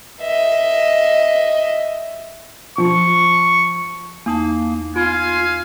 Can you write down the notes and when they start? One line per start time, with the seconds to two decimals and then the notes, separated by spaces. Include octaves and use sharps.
0.23 D#5 E5
2.78 F3 C#6
4.26 E2 A#3 D#4 A5
4.96 B3 F4 F5 G#5